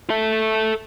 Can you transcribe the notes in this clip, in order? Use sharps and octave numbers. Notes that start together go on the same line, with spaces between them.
A4 E5